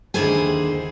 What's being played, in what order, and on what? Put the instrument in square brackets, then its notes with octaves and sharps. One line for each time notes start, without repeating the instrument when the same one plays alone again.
[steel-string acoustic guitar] D#2 D3 E4 G#4 C5 G#5